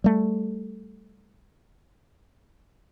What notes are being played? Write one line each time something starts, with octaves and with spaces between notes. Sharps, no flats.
G3 A3